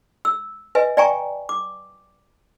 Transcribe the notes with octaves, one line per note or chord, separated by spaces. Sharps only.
E6
B4 D#5 E5 G#5
D5 E5 G5 G#5 A#5 C#6
D6